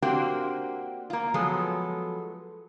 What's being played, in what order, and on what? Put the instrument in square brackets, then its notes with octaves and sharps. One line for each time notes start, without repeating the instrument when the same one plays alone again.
[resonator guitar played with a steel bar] A#3 C4 D4 F#4 G4
A#3 F4
F3 F#3 G#3 B3 A4